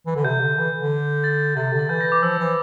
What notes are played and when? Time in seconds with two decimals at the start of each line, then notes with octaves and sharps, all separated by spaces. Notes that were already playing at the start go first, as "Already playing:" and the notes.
0.06 E3
0.15 D3
0.25 C3 G6
0.41 D3
0.58 E3
0.80 D3
1.24 A6
1.56 C3 A6
1.73 D3
1.79 A6
1.89 E3 G6
2.01 A#6
2.12 D6
2.22 F3 E6
2.39 E3